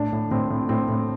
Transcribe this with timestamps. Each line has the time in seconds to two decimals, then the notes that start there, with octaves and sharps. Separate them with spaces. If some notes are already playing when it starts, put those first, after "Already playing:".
Already playing: A2 D4
0.12 A2
0.31 A2 C4
0.50 A2
0.69 A2 C4
0.88 A2